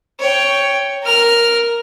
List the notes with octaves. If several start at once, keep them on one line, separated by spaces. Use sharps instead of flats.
C#5 G5
A#4 F6